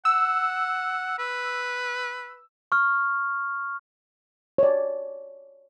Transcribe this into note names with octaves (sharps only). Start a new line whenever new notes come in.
F#5 E6
B4
C#6 F6
C#5 D5